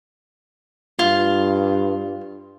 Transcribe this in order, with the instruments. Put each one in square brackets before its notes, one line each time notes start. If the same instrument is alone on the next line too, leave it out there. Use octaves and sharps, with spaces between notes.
[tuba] G2 [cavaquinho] F4